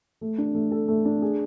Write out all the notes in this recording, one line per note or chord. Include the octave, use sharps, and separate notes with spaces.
A3
D4
A3
A4
A3
D4
G#4